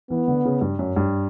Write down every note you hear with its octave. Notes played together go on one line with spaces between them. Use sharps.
E3 B3
D3
C#3
G2
F#2
G2